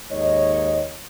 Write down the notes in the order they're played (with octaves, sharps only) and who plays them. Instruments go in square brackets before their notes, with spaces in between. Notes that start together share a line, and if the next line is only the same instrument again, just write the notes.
[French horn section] D#2 G#2 C#5 D#5